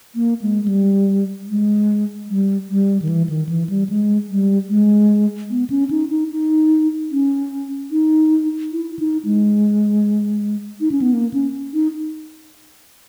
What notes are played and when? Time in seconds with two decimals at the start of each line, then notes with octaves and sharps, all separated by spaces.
0.15 A#3
0.42 G#3
0.64 G#3
0.68 G3
1.48 G#3
2.30 G3
2.70 G3
3.02 D#3
3.09 E3
3.29 D#3
3.49 E3
3.69 G3
3.89 G#3
4.30 G3
4.70 G#3
5.50 B3
5.70 C#4
5.91 D#4
6.10 D#4
6.31 D#4
7.12 C#4
7.91 D#4
8.72 E4
8.99 D#4
9.25 G#3
10.81 D#4
10.92 C#4
11.02 B3
11.13 A#3
11.33 C#4
11.74 D#4